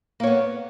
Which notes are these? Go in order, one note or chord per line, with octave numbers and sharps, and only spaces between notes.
A#3 B3 C#5